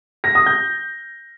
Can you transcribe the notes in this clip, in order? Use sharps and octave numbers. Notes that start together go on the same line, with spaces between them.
A#6
D#6
G6